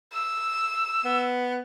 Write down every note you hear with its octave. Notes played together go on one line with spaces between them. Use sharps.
E6
B3